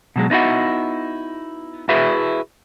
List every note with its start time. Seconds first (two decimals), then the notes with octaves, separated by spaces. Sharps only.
0.16 B2 F#3 G#3
0.30 B3 D#4 E4 F#4 F#5
1.89 E4 F#4 G#4 B4 E5